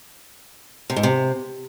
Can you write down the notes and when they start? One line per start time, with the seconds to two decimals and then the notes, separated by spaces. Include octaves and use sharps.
0.90 C3
0.96 G#2
1.03 C3